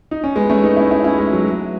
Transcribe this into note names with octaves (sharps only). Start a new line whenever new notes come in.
D#4
C#4
G#3 B3
A3 C#4
B3 D#4
C#4 E4
C#4 E4
C#4 E4
G#3
F#3